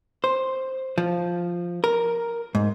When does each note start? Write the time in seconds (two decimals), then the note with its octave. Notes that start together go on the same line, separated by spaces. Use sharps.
0.24 C5
0.98 F3
1.84 A#4
2.55 G#2